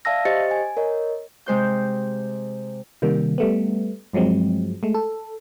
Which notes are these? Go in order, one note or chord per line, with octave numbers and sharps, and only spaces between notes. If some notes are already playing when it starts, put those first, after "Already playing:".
D5 E5 F5 A5 E6 A#6
G4 C5 D#5 A6 C#7
G#5
A#4 C#5 D#5
C3 G#3 C5 G6
C3 D#3 G3 A#3
G3 A3 B3
G2 F3 F#3 G#3 C4
G#3 A3
A4